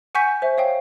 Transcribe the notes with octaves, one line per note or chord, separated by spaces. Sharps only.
F#5 G#5 C#6 G6 B6 D#7
C5 E5
C#5 F5 G5